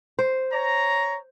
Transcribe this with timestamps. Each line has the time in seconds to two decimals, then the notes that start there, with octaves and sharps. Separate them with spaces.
0.19 C5
0.52 C#5 A#5